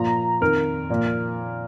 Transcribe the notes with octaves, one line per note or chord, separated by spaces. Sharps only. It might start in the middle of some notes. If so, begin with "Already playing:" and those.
Already playing: A#2 F3 A#5
F2 D#3 A#4
A#2 F3